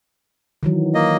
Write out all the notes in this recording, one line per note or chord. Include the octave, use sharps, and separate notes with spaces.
D#3 E3 F#3
A#3 D#5